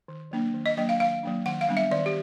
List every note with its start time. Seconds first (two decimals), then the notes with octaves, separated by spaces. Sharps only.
0.08 D#3
0.31 F#3 A#3 D4
0.54 D#3
0.66 D#5
0.77 F#3 A#3 D4 D#5
0.89 F5
1.00 D#3 F5
1.23 F#3 A#3 D4
1.46 D#3 F#5
1.61 F5
1.69 G3 B3 D4
1.77 E5
1.91 D#3 D5
2.06 G4